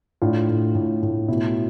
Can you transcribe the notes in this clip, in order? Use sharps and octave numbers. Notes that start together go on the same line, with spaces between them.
A2 D4 F4
A2
A2
A2
B2 E4